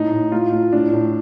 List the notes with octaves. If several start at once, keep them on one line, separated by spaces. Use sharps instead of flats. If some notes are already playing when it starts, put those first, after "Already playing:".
Already playing: A2 D#4
A2
A2 F4
A2
A2 D4
A2